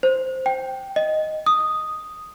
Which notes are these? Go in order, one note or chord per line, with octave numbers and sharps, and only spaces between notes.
C5
G5
D#5
D#6